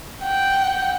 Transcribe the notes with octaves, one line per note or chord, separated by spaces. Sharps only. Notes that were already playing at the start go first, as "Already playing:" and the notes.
F#5 G5